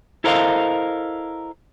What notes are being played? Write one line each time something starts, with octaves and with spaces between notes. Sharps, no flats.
E4 A4 A#4 C5 D#5 F5